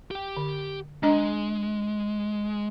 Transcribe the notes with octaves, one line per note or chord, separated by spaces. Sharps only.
G4 G5
D3
G#3 D4 D#5 A#5